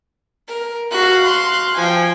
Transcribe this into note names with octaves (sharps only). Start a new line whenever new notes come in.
A#4
F#4 F5 F#6
C6
F3 G5 G#5